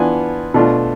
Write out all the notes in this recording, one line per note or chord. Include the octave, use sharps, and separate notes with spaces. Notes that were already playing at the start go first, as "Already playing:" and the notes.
Already playing: E3 B3 D4 F4 G#5
B2 A3 D4 F4